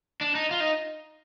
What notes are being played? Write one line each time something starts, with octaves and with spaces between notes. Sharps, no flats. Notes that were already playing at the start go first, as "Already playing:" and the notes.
D4
D#4
F4
D#4